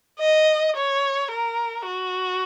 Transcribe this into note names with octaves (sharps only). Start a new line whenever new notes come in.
D#5
C#5
A#4
F#4